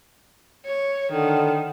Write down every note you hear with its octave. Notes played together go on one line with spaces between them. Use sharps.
C#5
D3 D#3